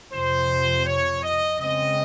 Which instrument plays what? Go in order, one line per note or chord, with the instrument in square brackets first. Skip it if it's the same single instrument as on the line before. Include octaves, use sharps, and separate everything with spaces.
[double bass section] F2 C3 F3 [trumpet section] C5
[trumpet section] C#5
D#5
[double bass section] C#3 G#3 C4 [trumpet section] D#5